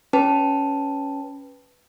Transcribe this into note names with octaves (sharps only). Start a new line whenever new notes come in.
C#4 B4 A5